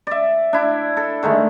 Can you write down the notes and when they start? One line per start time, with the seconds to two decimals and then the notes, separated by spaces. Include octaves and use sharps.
0.07 D5 E5
0.53 D4 E4
0.97 A4
1.23 D3 D#3 G#3 A3